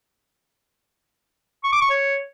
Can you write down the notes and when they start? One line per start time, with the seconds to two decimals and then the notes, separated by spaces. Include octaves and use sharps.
1.64 C#6
1.73 D6
1.81 C#6
1.90 C#5